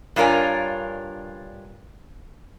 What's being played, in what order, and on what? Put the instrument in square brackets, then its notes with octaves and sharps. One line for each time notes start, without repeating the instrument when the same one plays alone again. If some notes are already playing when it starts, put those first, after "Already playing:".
[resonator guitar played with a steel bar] G2 D4 F4 A#4 C#5 G#5